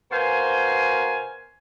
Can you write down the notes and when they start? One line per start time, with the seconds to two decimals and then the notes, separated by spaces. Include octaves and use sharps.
0.12 B2 A#4 C5 F5 G#5